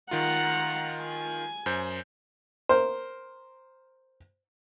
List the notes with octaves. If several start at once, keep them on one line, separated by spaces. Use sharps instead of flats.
D#3 F4 F#5 A#5
G#5
F#2 C5 G6
A#4 C5